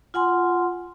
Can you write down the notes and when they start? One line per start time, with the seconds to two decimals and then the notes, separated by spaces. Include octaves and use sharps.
0.14 F4 F#5 G#5 C6